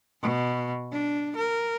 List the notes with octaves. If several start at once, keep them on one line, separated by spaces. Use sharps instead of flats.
B2
D4
A#4